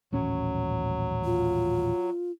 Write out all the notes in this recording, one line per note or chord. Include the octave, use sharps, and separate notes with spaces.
D#1 A1 F#3 C#4
F4